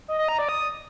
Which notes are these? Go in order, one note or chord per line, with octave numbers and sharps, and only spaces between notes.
D#5
D#5
A#5
D5
D#6